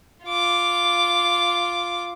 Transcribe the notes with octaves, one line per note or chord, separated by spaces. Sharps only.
F4 D6